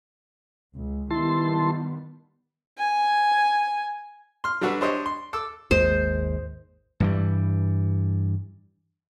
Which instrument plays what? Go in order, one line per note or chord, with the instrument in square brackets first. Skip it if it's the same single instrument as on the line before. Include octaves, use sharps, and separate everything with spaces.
[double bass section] C#2
[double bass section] D#3 G3 B3 [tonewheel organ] E4 A5 C6
[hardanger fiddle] G#5
[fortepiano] C6 F6
F#3 G3 D4 F#4 A4 B4
D4 G4 C5 C#5 D#5
C6
A4 D6 E6
[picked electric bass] G#1 D#2 G#3 [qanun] C5
[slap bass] G2 E3 G3